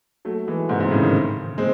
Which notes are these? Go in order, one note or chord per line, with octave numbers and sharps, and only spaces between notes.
F#3 A3
E3 G#3
G#2 C3
G#2 C3
A2 C#3
C3 D#3
G#3 C4